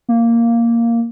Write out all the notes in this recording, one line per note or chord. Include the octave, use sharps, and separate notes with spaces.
A#3